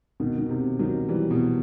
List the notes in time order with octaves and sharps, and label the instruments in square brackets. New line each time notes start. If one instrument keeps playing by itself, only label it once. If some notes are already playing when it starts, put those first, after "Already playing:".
[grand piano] B2 D#3
D#3
C3
D#3 F#3
E3 G3
B2